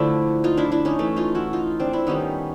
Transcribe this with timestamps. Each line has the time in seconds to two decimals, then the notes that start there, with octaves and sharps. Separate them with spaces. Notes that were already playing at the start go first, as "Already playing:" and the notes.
Already playing: D3 F3 A3 D4 E4
0.44 D#4 F4
0.57 D4 E4
0.72 D4 E4
0.85 C#4 D#4
0.99 E3 A3
1.16 D#4 F4
1.35 E4 F#4
1.53 D#4 F4
1.80 C4 D4
1.93 D4 E4
2.07 D#3 G3 B3 C#4 D#4